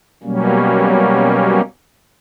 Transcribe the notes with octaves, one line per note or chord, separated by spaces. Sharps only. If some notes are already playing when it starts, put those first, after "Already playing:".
B2 F#3 G3 A#3 C#4